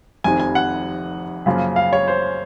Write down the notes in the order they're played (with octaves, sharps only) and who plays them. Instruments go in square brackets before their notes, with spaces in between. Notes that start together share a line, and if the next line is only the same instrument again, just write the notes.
[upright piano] F1 F2 C3 D#3 G#5
G#5
F#5
F#2 C#3 F3 A#3
F5
C#5
C5